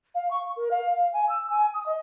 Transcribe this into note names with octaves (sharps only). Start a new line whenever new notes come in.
F5
C#6
A#4
F5
F5
G#5
E6
G#5
D#6
D#5